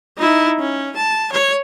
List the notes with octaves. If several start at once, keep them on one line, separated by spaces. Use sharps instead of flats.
D#4 E4
C#4
A5
C#5